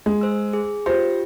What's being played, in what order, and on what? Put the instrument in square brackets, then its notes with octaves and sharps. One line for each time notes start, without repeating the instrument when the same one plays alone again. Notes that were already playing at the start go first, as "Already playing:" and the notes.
[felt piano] G#3
[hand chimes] C5 E6
G#4
[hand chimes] F4 G4 [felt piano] C5